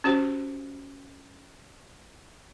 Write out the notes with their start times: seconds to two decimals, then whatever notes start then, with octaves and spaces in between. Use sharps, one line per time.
0.04 C#4 F#4 G4 C5